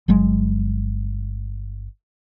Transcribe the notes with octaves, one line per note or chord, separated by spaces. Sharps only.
G1 F#3 G#3